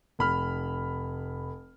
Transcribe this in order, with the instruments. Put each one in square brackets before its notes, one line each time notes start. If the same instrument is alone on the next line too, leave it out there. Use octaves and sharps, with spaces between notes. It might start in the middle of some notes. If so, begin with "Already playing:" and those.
[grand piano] F1 B5 F6